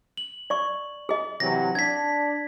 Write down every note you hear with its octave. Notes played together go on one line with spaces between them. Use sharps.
F#7
D5 C#6
G#4 D#5
C3 E3 F#3 A#6
D4 G#6 B6